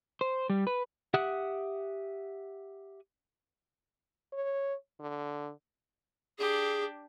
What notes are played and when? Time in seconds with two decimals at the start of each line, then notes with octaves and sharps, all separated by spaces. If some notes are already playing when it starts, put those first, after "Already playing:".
0.21 C5
0.50 G3
0.67 B4
1.14 G4 E5 F#5 D#6 F#6
4.33 C#5
5.00 D3
6.38 D4 G4 G#4